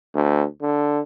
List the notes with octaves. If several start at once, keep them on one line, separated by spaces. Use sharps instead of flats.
D2
D3